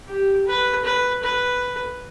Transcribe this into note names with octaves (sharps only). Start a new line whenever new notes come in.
G4
B4
B4
B4